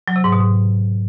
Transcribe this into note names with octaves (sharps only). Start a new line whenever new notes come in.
F#3
C3
G#2
B2
G#2